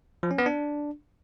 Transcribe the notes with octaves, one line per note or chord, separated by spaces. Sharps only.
F3
C#4
B3
D4